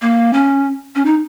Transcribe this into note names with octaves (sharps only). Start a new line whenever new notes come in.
A#3
C#4
C#4
D#4